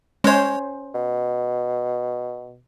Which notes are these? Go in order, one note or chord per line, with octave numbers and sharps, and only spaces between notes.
G#3 C#4 C5 C#5
B2